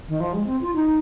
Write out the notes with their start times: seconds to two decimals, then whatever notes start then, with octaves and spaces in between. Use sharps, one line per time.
0.08 D#3
0.20 F3
0.33 G#3
0.46 C4
0.61 F4
0.75 D#4